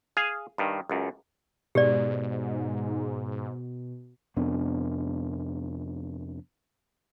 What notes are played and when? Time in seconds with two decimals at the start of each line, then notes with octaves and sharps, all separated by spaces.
0.17 G#4 F5 G#5
0.58 G2 D#3
0.90 C#2 F#2
1.75 G#2 B2 G4 D5
4.37 F2 C3 B3 D4